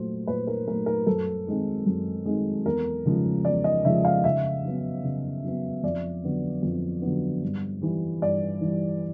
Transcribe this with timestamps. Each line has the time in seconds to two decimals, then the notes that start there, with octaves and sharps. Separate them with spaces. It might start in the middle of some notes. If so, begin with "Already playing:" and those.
Already playing: A#2 F#3 A3 C5
0.27 A#2 B4
0.47 A#4
0.67 F#3 A3 A#4
0.86 A#4
1.07 F#2 A4
1.47 D#3 G#3 C4
1.86 F#2
2.26 D#3 G#3 C4
2.65 E2 A#4
3.06 C#3 F3 G#3
3.45 E2 D5
3.64 D#5
3.84 C#3 F3 G#3 E5
4.05 F5
4.24 C#3 E5
4.64 F#3 B3
5.04 C#3
5.44 F#3 B3
5.83 F2 D5
6.24 D3 F#3 B3
6.62 F2
7.02 D3 F#3 B3
7.42 G2
7.82 E3 G3
8.21 G2 D5
8.61 E3 G3